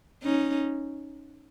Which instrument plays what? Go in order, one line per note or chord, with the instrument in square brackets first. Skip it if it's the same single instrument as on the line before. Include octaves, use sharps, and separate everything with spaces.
[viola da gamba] C#4 D#4